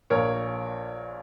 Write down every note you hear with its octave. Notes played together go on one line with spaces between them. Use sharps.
A#1 A#2 A#4 C#5